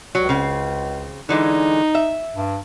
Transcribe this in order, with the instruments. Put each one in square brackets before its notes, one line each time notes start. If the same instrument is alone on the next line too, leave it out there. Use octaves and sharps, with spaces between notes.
[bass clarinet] C#2 [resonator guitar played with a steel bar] F#3
[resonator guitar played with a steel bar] C#3 C4
[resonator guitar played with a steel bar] D3 E3 G#3 [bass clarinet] D#4
[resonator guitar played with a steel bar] E5
[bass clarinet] G2